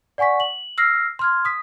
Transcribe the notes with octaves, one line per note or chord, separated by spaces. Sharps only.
D5 F#5 G#5 C#6 B6
F#7
E6 F6 A#6 C7
C6 F6 G#6
D#6 B6